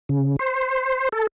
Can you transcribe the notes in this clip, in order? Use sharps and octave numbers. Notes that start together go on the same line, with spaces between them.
C#3
C5
A4